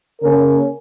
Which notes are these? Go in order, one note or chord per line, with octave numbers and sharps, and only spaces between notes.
C#3 A#3 C#4 A#4